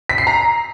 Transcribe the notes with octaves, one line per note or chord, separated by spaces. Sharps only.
B6
C7
A#5